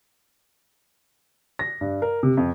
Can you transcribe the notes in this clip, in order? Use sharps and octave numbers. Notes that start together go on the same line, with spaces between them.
A#6
G2
A#4
C3
F2